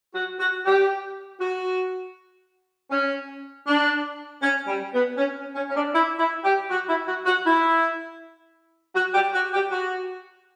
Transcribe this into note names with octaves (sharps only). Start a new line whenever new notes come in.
F#4
F#4
G4
F#4
C#4
D4
C#4
G3
B3
C#4
C#4
C#4
D4
E4
E4
G4
F#4
E4
F#4
F#4
E4
F#4
G4
F#4
G4
F#4